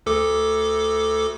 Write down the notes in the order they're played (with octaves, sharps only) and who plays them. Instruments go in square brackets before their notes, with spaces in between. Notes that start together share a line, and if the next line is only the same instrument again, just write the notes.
[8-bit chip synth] D2 A4 D6